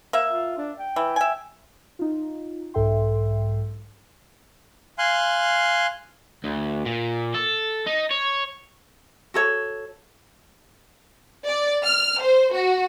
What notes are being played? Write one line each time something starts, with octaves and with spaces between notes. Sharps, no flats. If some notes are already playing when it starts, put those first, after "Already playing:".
A#3 E5
F4
D4
G5
E3
E5 G#5
D#4 F4
B1 G#2 A4 E5 G5 C6
F5 G#5 C6 F#6
D2
A#2
A4
D#4
C#5
F#4 A4 C#5
D5
F6
C5
F#4